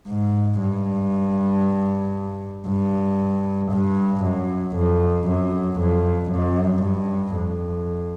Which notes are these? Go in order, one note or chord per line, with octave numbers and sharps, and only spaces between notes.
G#2
G2
G2
G2
F#2
F2
F#2
F2
F#2
G2
F2